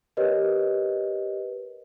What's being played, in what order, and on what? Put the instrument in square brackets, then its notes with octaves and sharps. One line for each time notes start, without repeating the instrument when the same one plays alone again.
[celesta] G4 A#4 B4 C#5 D#5